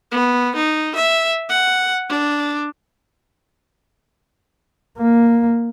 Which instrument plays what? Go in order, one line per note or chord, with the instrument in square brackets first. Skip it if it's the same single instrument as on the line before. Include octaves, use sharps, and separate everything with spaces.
[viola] B3
D#4
E5
F#5
D4
[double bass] A#3